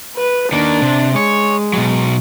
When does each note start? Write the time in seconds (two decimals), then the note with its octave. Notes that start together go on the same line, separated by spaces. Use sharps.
0.16 B4
0.52 D#3 A#3 D4
0.82 C3
1.16 G#3 C#5
1.73 B2 F#3